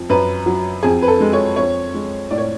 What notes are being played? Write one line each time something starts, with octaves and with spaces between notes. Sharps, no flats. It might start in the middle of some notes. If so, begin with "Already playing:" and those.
Already playing: F2 F3
F#2 B4
F#3
F2 G#4
B4
A4
G#3
C#5
F2 C#5
G#3
A2 D5
C#5